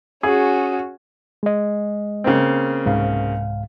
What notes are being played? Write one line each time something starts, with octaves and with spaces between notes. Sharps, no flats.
C#4 F#4 G#4
G#3 D#5
C#3 A#3 C4
C2 G#2 F5